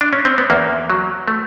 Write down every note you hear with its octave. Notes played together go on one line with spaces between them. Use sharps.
D4
C#4
C4
B3
E2 A#3
F#3
A3